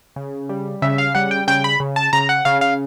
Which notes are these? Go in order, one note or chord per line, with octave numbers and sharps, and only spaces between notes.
C#3
G3
C#3 E5
F5
G3 F#5
G5
C#3 G5
B5
C#3
A5
C#3 A#5
F#5
C#3 F5
F5